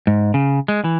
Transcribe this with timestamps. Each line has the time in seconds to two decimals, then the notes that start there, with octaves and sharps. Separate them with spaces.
0.07 G#2
0.34 C#3
0.68 G#3
0.84 E3